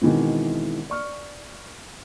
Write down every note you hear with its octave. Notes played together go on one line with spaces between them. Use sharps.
B2 D#3 E3 G#3 C4
D5 C#6 F6